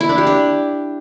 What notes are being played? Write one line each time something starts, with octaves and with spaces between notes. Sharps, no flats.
E4
D4
G4
D4